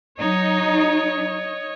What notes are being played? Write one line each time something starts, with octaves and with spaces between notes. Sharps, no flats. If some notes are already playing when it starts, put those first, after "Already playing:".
F#3 D#4 C#5 D#5